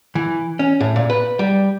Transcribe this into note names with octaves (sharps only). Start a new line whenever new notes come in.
E3
C#4
A2
A#2
B4
G3